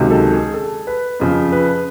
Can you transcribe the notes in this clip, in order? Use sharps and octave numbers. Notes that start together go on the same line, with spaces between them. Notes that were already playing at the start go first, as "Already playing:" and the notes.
Already playing: C#2 C3 D#3 F#3
A4
G#4
A4
B4
F2 C#3 F3
B4